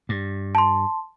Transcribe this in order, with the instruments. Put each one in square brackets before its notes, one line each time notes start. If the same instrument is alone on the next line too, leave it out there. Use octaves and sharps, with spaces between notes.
[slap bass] G2
[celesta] A5 C6